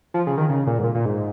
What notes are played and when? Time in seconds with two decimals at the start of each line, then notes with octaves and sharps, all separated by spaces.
0.14 F3
0.27 C#3
0.37 D#3
0.49 C#3
0.67 A#2
0.79 G#2
0.84 A#2
0.95 A#2
1.05 G#2